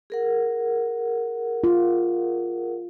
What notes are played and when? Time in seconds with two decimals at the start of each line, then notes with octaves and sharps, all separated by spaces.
0.10 G#4 A#4 F#5
1.64 F4